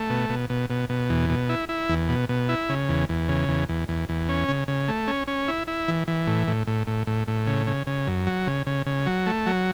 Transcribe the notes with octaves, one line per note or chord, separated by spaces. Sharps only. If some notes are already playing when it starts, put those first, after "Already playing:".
Already playing: A3
B2
B2
B2
B2
B2
E2
B2
E4
E4
E2
B2
B2
E4
C#3
E2
E2
C#3
E2
E2
E2
E2
C#4
C#3
C#3
A3
C#4
C#4
E4
E4
E3
E3
A2
A2
A2
A2
A2
A2
C#3
C#3
C#3
F#2
F#3
C#3
C#3
C#3
F#3
A3
F#3